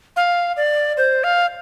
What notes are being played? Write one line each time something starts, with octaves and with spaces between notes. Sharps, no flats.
F5
D5
C5
F5